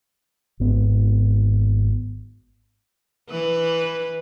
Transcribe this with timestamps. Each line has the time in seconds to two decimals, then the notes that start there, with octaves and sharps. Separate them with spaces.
0.60 G#1 G#2 B3
3.30 E3 B4